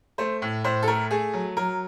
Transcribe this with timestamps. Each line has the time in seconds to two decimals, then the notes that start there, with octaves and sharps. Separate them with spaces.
0.18 A3 C5
0.42 A2
0.64 A2 C5
0.83 A4
0.87 A3 A#4
1.11 A3 G#4
1.33 F#3
1.57 F#3 A#4